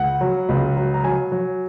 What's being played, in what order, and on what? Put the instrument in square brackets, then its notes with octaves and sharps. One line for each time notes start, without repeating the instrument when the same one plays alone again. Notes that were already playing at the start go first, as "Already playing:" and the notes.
Already playing: [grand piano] C#2 F#5
F#3
C#2
F#3
A#5
F#3 G#5
F#3